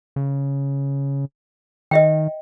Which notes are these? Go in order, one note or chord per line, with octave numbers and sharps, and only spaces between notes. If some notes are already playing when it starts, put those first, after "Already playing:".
C#3
D#3 D#5 E5 G5